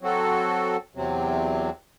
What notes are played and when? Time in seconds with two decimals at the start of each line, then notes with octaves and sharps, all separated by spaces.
0.02 F#3 C4 F#4 A4
0.95 E2 C3 F#3 C4